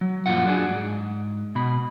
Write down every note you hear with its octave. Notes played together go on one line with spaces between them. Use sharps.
F#3
F#2 A#2 C#3 F3 F4 F#5
F#3 D4 G#4
G#2
B2 B5